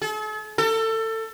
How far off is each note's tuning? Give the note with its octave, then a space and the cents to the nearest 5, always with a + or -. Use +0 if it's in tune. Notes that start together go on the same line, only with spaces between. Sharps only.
A4 -45
A4 +25